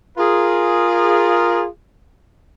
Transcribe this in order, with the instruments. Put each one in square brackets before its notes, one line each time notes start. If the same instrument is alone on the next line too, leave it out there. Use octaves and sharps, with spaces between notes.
[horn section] F4 G#4 A#4